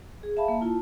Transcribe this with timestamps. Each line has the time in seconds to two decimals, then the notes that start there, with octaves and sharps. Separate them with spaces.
0.23 G#4
0.37 E5 F5 A5 B5
0.48 A#3 A5
0.61 E4 F4 A5